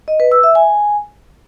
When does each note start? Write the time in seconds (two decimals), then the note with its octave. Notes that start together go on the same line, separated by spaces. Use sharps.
0.08 D#5
0.20 B4
0.32 E6
0.43 E5
0.55 G#5